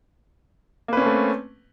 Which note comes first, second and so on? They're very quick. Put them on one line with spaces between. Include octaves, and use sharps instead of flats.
A#3 B4 C#4 C4 A3